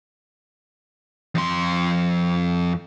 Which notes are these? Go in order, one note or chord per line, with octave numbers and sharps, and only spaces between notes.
F2 C6